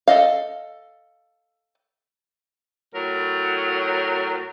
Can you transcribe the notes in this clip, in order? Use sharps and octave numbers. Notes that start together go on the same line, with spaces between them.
A4 D#5 F5
A2 F#3 A#4